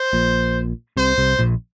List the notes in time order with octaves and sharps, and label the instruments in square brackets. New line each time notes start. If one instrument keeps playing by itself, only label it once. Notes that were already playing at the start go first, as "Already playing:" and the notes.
Already playing: [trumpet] C5
[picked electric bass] A#1 A#2
[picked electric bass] C2 C3 [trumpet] C5
[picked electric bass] C2 C3
A#1 A#2